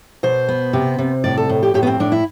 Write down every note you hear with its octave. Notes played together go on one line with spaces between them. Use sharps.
B2 C5
B3
C3
C3
A2 D5
A4
A2
G4
A2 G4
B3
C4
A2 D4
E4